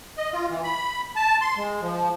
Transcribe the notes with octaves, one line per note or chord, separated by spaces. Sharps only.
D#5
F4
E3
B5
A5
C6
G#3
F3